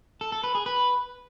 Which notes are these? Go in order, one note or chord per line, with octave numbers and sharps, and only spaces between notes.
A4
A4
B4
G#4
B4